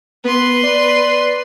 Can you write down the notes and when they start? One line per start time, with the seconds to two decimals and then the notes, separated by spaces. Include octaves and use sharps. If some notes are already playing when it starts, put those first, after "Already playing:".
0.25 B3 B4 C6
0.63 D5